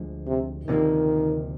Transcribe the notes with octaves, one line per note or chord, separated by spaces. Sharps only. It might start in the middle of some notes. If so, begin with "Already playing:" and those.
Already playing: D2 D3 F3 G#3
C3
D2 C3 D#3 F3 A#3